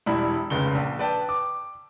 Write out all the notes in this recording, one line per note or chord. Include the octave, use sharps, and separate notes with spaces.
E1 G3 E4 B5
F1 C#2 C#3 G7
A#1
B4 D5 G5 A5
D6